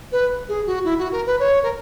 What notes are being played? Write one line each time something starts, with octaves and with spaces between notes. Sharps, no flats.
B4
G#4
F#4
E4
F#4
A#4
B4
C#5
A#4